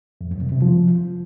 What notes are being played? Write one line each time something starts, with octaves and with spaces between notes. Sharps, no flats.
F2
F#2
C3
C3
F3